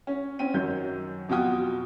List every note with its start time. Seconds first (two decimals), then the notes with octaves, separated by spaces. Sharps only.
0.07 C#4
0.39 C4 C#4 G5 D#7
0.54 F#2 D#3 F#3 G6
1.29 F2 B2 F4 F#4 G5 D#6